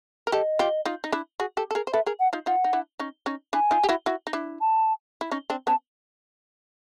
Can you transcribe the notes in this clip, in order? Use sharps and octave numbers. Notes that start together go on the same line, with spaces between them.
A#4
G4 A4 D#5
F4 G4
D#4 F4
D#4
D4 E4
F#4 G#4
G4 A4
A4
G#4 A#4
C5
A4 B4 E5
G#4 A#4
F#5
D#4 F4
D#4 F4 F#5
D#4
D4 E4
C#4 D#4
C#4 D#4
D4 E4 G#5
D#4 F4
G4
E4 F#4
E4 F#4
D#4
D4 E4
A5
E4
C#4 D#4
C4 D4
B3 C#4 A5